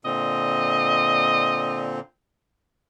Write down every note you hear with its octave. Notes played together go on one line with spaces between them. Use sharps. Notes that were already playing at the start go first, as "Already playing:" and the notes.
A#2 D3 C4 D#5